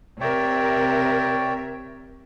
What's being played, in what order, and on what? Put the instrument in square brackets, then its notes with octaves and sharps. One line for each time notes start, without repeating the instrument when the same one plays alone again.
[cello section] C3 A#4 E5 [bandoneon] C#5 D5 G5